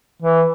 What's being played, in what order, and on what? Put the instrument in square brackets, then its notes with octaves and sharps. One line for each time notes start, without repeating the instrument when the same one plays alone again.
[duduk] E3